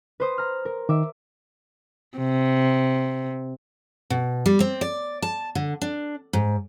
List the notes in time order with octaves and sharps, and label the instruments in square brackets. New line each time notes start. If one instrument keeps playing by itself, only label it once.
[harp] B4 C5 D#6
A#5 F6
A#4
[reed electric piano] D#3 [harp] E5 D6
[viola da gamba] C3
[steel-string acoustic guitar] B2
G3
C4
D5
A5
D3
D4
G#2